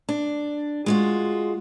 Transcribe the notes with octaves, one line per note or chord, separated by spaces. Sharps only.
D4
G#3 F4 F#4